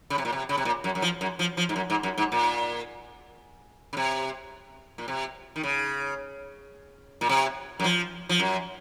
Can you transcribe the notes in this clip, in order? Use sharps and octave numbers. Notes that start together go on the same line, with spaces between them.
C#3
C3
A#2
C3
C#3
C3
A#2
F#2
F#2
F3
F#2
F3
F3
G#2
F#2
G#2
F#2
G#2
A#2
C#3
C3
A#2
C3
D#3
C#3
A#2
C3
F#2
F3
F3
F#2